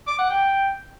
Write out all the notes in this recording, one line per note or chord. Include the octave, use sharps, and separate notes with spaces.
D6
F#5
G5